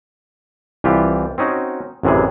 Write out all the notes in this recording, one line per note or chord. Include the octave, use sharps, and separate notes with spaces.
C2 E3 F4 G4
C4 C#4 D#4 F#4
A1 F#2 C3 E3 G#4